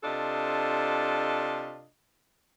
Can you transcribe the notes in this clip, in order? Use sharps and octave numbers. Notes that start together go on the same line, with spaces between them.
C3 D4 F4 A4 D#5